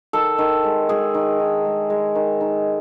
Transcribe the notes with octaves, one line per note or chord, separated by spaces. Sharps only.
D#3 A4
D#3
G#3
G#3 G#4
D#3
D#3
G#3
G#3
D#3
D#3